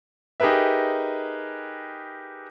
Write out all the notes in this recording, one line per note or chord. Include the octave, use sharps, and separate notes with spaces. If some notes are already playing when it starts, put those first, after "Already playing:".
D#4 G4 G#4 A#4 B4 E5